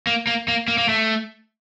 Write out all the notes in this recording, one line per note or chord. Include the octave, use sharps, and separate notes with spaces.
A#3
A#3
A#3
A#3
A#3
A3